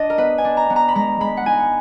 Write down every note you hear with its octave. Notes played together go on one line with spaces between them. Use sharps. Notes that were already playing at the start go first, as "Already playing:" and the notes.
Already playing: D4 D#5
A#4
B3 B4
G#5
D4
A#5
B3
A#5
B5
G#3 A#5
G#3 B5
F#5
D#4 G#5